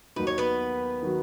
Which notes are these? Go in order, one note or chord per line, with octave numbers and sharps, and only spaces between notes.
D#2 D#3 F#3 D#4 F#4 B4
C#5
B3 B4
D#3 F#3 D#4 F#4